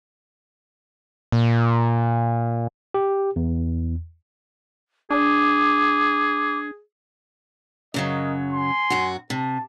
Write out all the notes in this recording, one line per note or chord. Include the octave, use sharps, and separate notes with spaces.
A#2
G4
E2
D4 G#4 D6
F#2 C#3 F#3 A#4 D#5
G#5 C6
F#2 F#4
C3 A5